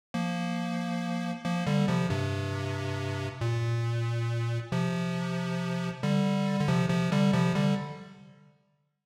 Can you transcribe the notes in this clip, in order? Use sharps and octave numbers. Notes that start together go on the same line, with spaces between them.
F3 A#3
F3 A#3
D3 G3
C3 F3
G2 C3
A#2
C3 F3
D3 G3
D3
C3 F3
C3 F3
D3 G3
C3 F3
D3 G3